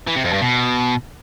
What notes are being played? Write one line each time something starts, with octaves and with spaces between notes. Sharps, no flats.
E3
C3
F2
G2
B2